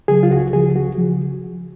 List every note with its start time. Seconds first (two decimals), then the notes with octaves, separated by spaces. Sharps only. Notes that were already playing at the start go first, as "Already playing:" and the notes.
0.08 C#3 F#3 G#4
0.23 F4
0.31 C#2 F#4
0.53 C#3 F3 G#4
0.75 C#2 F#4
0.98 C#3 F3